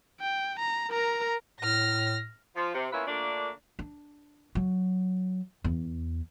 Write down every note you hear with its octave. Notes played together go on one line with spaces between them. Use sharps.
G5
A#5
A#4 A#5
A2 F6 A#6
F3 F4
C3
A#3 B3 C#4 E4 F4 B4
A#2 D3 A3 A#3 D4
D4
F#3
E2